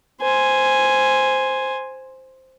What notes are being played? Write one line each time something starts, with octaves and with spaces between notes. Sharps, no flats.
C5 G#5